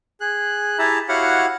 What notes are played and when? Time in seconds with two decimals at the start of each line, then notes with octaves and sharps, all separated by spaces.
0.20 G#4 F#6
0.79 E4 G4 G#4 E5 A5 A#5
1.09 E4 F#4 G4 C#5 F5 F#5